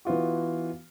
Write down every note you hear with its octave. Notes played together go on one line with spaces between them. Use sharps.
E3 B3 F4 F#4